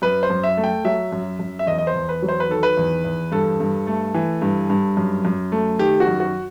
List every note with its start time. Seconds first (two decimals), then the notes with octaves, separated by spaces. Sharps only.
0.02 F#2 B4
0.23 C5
0.30 F#2
0.44 E5
0.57 A3
0.64 G5
0.85 F#3 E5
1.12 F#2
1.39 F#2
1.59 E5
1.67 E2 D#5
1.78 D#5
1.87 C5
1.94 E2
2.09 B4
2.22 F#3
2.29 C5
2.40 B4
2.49 D#3 A4
2.63 B4
2.77 E2
3.05 E2
3.31 G2 A4
3.60 G2
3.87 A3
4.14 E3
4.42 G2
4.70 G2
4.97 F#2
5.25 F#2
5.52 A3
5.79 D#3 G4
6.00 F#4
6.07 F#2
6.20 F#4